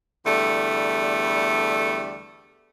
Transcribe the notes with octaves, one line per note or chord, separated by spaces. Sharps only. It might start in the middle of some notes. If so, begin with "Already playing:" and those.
E2 D3 G3 A3